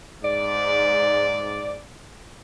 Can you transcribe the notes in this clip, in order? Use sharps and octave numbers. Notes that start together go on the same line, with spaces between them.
G#2 D5